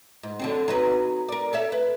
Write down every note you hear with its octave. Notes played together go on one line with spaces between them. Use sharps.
G#2
D3 F#3 C4
F#3 D#4 B4
A#4 D5
A4 C#5 E5
B4